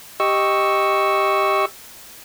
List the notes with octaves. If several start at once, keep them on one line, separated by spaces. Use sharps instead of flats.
G4 D#5 C#6 E6